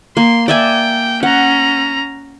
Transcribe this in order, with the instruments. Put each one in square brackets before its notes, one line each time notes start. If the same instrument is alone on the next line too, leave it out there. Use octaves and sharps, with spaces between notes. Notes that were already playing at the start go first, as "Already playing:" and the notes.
[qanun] A#3 [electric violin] C6
[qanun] D5 E5 G#5 [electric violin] G5
[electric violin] C#4 A#5 [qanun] F#5